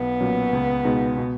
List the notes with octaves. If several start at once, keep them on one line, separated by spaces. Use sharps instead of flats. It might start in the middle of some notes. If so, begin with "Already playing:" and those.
Already playing: B1 B3
A#2 F#3 C#4
C#2
B2 G#3 D#4
B2